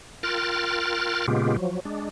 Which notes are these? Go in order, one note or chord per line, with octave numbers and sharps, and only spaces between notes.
F4 A#4 G5 F6 F#6 A6
A#2 C#3 G#3 B3 F4 G4
F3 F#3
G#3 D4